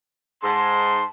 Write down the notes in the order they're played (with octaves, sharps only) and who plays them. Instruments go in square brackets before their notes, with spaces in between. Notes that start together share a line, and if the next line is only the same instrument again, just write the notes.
[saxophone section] G#2 [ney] A5 [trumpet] C6